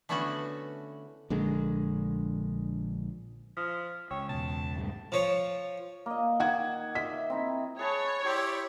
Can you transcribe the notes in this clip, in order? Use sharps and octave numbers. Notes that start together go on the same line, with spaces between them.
D3 A3 B3 C#4 E4 F#4
A#1 D3 G#3
F3 D#6 F6 B6
C#2 C#5 G5 E6
E2 B2 A5
G#2 G3 A3
F3 C#5
A#3 D#5
D#3 F#5 G#6
D#5 E5 B6
C4 D#4 E4
G#4 B4 C#5 A5
E4 G4 D5 G5 C6